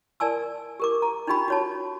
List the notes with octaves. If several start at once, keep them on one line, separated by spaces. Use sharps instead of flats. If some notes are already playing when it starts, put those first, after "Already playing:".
A#4 D5 G#5 A5 E6
G4 A#4 D6
A#5
D4 D#4 F4 G4 G5 B5
F#4 C#5 A5